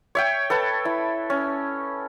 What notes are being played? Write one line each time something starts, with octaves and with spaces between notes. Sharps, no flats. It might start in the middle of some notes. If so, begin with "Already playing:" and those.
C#5 E5 G5
A4 B4 A5
E4
C#4